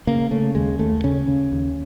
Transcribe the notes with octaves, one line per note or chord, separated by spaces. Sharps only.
C#3 A#3
C#3 A3
D#2 G#3
D#2 A3
C#3 C#4
C#3
D#2